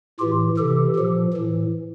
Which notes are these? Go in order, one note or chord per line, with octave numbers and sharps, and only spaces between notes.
A2 E3 F4 G4
C3 E3 G4 A4
A#2 F3
A2 E3